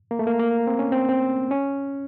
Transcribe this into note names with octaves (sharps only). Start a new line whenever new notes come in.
A#3
A3
A#3
A#3
C4
C#4
C4
C4
C#4